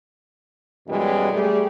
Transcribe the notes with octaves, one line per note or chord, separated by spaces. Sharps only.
F#2 B2 E3 G3 G#3
G3 A3 G4 G#4